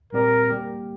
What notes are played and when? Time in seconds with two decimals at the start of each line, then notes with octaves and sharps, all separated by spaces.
0.13 A#2 G3 C4 G4 A#4 D5
0.50 G3 A#3 G4